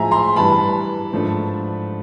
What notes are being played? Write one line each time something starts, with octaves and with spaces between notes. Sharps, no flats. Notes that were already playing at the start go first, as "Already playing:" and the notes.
Already playing: A2 F3 G#3 E5 G#5 A#5
A#5 C6
G2 E3 G3 A5 B5
G#2 F3 A3 D4